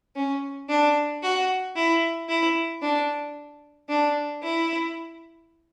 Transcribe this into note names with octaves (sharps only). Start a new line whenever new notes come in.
C#4
D4
F#4
E4
E4
D4
D4
E4